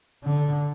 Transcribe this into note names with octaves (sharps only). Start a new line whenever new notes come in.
D3